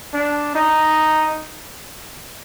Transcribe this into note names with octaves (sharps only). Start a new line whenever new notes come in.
D4
D#4